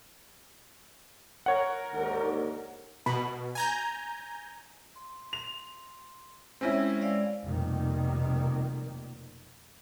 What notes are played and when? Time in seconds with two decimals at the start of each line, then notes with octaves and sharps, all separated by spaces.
1.46 A#4 C#5 F#5
1.94 D#2 G#2 D3
3.06 B2 B5
3.55 G#5 A#5 G6
4.96 C6
5.33 F7
6.61 G#3 C4 C#4 E4
7.01 G#3 D5 F5
7.46 F1 B2 D#3 G3 A#3